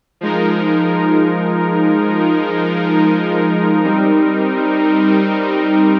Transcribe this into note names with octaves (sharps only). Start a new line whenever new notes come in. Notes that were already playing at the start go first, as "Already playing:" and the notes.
F3 G#3 D#4 A#4
G3 C4 D#4 A#4